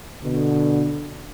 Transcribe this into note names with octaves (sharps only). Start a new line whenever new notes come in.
B2 D3